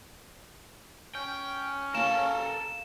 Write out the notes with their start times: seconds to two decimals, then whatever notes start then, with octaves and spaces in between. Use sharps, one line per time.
1.15 C#4 G5
1.95 A#3 A4 A#4 E7